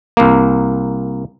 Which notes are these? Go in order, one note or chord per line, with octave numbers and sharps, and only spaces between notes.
C2 A#3